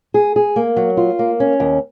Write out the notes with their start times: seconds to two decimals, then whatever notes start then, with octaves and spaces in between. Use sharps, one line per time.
0.14 G#4
0.36 G#4
0.56 A#3
0.77 F#3
0.97 F4
1.19 A#3
1.40 C#4
1.60 D#2